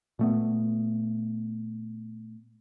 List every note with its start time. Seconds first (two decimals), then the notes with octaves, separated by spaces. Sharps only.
0.19 A#2 A3 B3